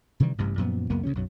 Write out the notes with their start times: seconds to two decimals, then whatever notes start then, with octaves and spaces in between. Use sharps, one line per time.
0.20 C3 D#3 E3 G3
0.38 A1 G2 C3
0.58 F#2 A#2 F3 B3
0.90 C#2 F#2 A#3 B3
1.03 D2 C#3 G3 C#4
1.15 B1 F#2 F#3